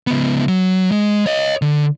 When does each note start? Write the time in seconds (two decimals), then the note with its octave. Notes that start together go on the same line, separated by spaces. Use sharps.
0.07 C#2 B3
0.48 F#3
0.91 G#3
1.26 C#5 D#5
1.62 D3